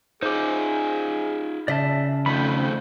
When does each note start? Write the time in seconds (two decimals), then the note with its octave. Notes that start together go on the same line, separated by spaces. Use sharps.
0.23 D#4 F4 G#4 C5 D6
1.68 C#3 D5 E5 A5
2.26 F2 D#3 A3 C5 B5